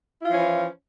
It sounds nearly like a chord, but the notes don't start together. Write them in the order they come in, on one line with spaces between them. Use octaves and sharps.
E4 F4 F3 C#4 E3